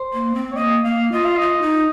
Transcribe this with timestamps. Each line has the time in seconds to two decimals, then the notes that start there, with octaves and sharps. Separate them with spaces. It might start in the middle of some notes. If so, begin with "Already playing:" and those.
Already playing: C5
0.14 A#3
0.35 C4
0.52 C#5
0.56 A#3 D#5
0.84 A#3 F5
1.12 F4 D#5
1.25 F5
1.37 F4 D#5
1.62 D#4